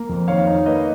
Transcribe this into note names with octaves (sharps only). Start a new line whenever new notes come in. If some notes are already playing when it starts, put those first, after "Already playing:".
Already playing: A#3 A#4
F2
D#3 C#5 F5
D#4
A#3 B4 D#5